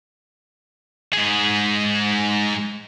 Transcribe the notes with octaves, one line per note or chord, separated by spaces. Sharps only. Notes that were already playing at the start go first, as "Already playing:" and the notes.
G#2 G#4